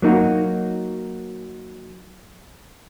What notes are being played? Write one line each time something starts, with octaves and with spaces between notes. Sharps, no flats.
F#3 A#3 D#4 F#4